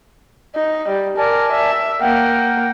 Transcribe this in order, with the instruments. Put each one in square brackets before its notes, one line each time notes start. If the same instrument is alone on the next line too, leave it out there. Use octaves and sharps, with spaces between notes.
[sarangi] D#4
G3
[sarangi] A#4 [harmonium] D5 G#5 A5
[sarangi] E5
[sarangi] A#3 [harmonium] F#5 G5